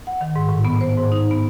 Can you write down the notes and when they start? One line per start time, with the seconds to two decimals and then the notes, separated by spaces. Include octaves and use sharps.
0.07 F#5
0.21 D#3
0.36 G#2
0.49 A2
0.65 B3
0.81 C5
0.97 G#2
1.12 D#4
1.31 B3